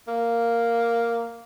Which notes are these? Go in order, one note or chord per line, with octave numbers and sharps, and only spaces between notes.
A#3